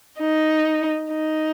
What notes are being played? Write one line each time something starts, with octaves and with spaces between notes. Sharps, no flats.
D#4
D#4